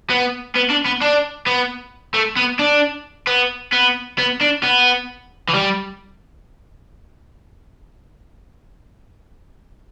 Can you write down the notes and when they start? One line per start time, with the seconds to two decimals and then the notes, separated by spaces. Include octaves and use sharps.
0.10 B3
0.56 B3
0.70 D4
0.85 B3
1.01 D4
1.46 B3
2.14 A3
2.37 B3
2.59 D4
3.27 B3
3.73 B3
4.18 B3
4.41 D4
4.63 B3
5.49 E3
5.54 G3